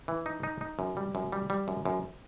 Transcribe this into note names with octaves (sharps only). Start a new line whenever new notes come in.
E3
D#4
D#4
D#4
F#2
G3
F#2
G3
G3
F#2
F#2